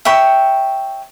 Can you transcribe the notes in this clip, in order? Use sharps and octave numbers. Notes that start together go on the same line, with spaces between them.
C#5 E5 G5 B5